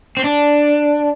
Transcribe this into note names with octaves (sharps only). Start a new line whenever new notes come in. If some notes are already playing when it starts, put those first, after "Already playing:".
C4
D4